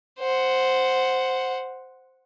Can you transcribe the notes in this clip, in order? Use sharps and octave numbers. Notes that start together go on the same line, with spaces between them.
C5 F#5